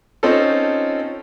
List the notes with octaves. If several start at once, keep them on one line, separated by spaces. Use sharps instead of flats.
C4 C#4 D#4 F4 A4